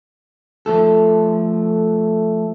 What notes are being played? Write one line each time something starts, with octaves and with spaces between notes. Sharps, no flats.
F3 A3 A4